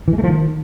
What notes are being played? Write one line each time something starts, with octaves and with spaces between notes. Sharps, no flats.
E3
G#3
A3
F3
D#3